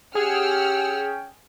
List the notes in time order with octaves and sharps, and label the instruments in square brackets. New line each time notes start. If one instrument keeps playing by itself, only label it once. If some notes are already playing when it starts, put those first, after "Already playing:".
[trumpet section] C#4 G5 [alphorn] G4 [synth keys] G#4 [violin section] F#5 E6 F6